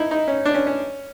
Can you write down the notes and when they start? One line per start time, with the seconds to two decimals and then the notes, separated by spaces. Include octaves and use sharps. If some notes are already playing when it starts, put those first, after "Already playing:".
Already playing: D#4 E4
0.11 D#4
0.28 C#4
0.45 D4
0.54 C#4
0.67 C#4